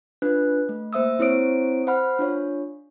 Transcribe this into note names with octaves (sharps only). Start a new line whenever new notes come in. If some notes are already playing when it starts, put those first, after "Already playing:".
D4 F4 B4 F#6
A3
A#3 C5 E5 D#6 E6
C4 E4 C5 C#5 D#6 D7
C5 F#5 B5 F6
D4 F4 C#5